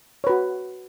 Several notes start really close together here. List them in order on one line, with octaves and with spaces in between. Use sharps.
C#5 B4 F#4